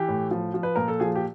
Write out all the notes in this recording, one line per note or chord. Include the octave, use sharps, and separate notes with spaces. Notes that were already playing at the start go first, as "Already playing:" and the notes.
Already playing: E3 G4
A2
F3
F3
B4
A#2 A#4
A4
F3 G#4
G4